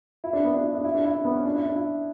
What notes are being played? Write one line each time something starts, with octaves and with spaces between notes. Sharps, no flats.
E4
D4
B3
D4
E4
D4
E4
D4
E4
D4
B3
C#4
D4
E4
D4
E4